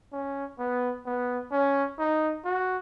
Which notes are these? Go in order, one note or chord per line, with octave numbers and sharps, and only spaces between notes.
C#4
B3
B3
C#4
D#4
F#4